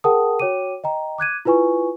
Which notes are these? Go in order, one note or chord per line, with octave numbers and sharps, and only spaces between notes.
G#4 A#4 F#5 G5 A5 D#6
F#4 C#5 G5 D6 D#7
D#5 G5 A#5
D6 F#6 G#6 D#7
E4 F4 B4 G#5 C#6